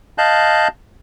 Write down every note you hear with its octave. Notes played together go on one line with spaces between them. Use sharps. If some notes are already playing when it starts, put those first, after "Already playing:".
D#5 F5 A5 F#6 G6